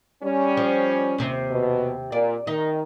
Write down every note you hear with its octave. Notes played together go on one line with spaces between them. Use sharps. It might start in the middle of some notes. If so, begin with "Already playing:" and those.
G3 C#4
F3
D#2 C3
B2
A#2 D5
D#3 D#4